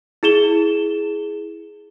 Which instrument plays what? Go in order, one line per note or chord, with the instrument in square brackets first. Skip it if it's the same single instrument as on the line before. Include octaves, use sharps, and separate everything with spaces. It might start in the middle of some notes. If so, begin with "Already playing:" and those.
[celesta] E4 G#4 E7 G7